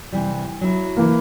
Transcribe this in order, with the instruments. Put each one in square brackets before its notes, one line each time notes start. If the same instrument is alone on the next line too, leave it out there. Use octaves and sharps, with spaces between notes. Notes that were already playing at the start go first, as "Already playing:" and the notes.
[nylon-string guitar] C3 E3 G3
F#3 E4
[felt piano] E3 A#3